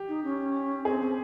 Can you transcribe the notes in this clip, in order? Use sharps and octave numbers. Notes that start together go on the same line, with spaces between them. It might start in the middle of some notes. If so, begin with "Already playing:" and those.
Already playing: G4
D#4
C#4
C4 G#4
C4